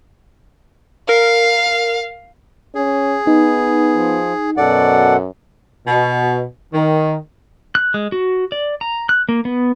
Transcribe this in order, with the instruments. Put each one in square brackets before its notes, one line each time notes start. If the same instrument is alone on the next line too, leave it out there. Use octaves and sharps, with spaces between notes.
[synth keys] A#4 [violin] F5
[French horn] C#4 [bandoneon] G#4
[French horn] B3 [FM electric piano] D#4
[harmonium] F3
[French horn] F#2 [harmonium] B2 A4 F#5 [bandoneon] D5
[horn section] B2
D#3
[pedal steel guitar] F#6
G#3
F#4
D5
A#5
F#6
A#3
B3